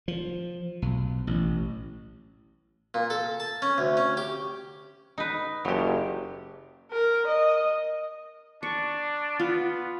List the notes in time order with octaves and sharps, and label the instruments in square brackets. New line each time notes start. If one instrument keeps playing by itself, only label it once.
[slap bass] F3
B1
A1
[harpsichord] A#2
A4
A5
C#4
D2
C#4
G4
[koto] D#4 B4
[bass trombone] F#1 [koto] F#3 G4
[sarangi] A#4
D#5
[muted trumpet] D4 [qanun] C#6
[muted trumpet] B3 [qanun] F4